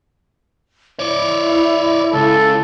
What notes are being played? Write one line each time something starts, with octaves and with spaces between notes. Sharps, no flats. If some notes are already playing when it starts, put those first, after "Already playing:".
E4 C#5 D5
C#2 A4